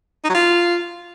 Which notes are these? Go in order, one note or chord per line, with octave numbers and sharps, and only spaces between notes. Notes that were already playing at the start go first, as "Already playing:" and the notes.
D#4
F#3
F4